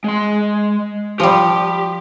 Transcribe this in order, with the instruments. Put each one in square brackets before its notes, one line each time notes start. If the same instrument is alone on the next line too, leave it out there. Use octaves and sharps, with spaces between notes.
[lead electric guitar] G#3 C6
[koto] F3 G3 [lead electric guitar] G4